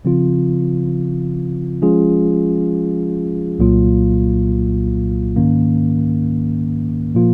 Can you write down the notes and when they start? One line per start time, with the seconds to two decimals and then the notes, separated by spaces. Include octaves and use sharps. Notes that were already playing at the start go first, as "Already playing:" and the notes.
0.05 C#3 F3 C4 F4
1.82 F3 G#3 C#4 F4 G#4
3.59 C2 A#2 F#3 A#3 F4
5.36 G#2 D#3 A#3 C#4
7.15 A#2 F3 A#3 F4